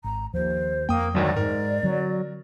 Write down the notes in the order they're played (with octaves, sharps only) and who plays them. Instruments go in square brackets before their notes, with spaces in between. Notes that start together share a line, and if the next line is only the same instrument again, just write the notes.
[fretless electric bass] G#1 [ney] A#5
[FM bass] D#2 [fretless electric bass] F3 [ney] C5
[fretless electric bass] F2 [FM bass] A#3 [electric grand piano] G5 D#6
[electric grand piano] G#1 D2 D#3 [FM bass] F#3 [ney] D5
[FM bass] G#2 [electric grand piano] A#4
[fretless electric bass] D3 C4 [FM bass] F#3